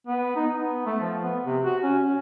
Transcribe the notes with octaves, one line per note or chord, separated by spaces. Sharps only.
B3
D#4
B3
A3
F3
B3
C3
F#4
C#4
C#4